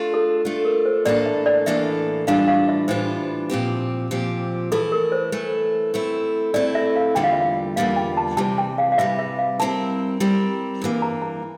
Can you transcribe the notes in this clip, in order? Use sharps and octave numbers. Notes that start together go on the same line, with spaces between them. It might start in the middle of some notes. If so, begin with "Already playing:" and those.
Already playing: A3 D4 F4
A4
A3 D4 F4
A#4
C5
A2 E3 A#3 D4 A4 D5
E5
D5
A2 E3 A#3 D4 A4 E5
A2 E3 G3 D4 F4 F5
F5
E5
A2 E3 G3 D4 F4 C5
A#2 F3 C4 G4
A#2 F3 C4 G4
E3 A3 E4 A4
A#4
C5
E3 A3 E4
A3 C4 E4
A3 C4 E4 D5
E5
F5
E2 D3 G3 A#3 F4 G5
F5
E5
F5
E2 D3 G3 A#3 F4 F5
G5
A5
C3 E3 G3 A5
G5
F5
F5
C3 E3 G3 E5
E5
F5
G3 C4 E4 A#4 A5
G3 C4 E4 A#4
G2 E3 A#3
A#5
A#5